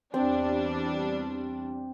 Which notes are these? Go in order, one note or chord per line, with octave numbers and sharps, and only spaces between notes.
E2 G3 C4 D4